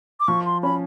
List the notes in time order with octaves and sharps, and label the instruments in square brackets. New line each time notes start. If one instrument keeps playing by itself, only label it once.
[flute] D6
[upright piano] F3 [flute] C#6
[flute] C6
[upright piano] C#4 [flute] B5